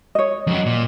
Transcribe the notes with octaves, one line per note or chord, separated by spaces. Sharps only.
C#5 D#5
F2 F#3
A#2